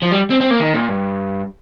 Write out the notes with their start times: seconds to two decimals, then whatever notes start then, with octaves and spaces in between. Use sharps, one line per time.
0.02 F3
0.11 G3
0.30 C4
0.41 C4
0.51 A#3
0.61 D#3
0.74 A#2
0.89 G2